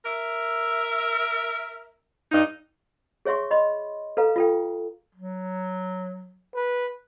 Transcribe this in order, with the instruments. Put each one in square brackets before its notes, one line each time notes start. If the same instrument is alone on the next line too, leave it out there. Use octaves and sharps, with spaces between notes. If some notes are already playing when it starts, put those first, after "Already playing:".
[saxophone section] A#4 E5
G2 D#4
[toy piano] G#4 C#5 E5 C6 C#6
D#5 B5 C6
A4 B4 F5 A#5
F4 A4 G5
[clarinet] F#3
[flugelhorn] B4